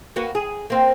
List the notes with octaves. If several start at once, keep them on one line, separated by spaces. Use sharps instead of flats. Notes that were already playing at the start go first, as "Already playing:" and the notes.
A#3 F#4 B4
G#4
A#3 C4